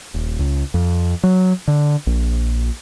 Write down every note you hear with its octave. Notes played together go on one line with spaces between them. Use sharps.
D#1
C#2
F2
F#3
D3
A#1